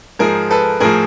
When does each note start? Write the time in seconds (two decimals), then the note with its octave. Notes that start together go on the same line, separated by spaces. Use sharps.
0.19 G#2 F3 G#4 A#4
0.51 A4 B4
0.80 A2 F3 G#4 A#4